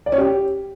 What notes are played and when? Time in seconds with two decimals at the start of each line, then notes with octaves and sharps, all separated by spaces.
0.06 D5
0.12 C#4
0.18 G4